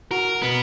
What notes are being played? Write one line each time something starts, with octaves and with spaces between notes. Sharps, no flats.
F#4 A#4
B2 B3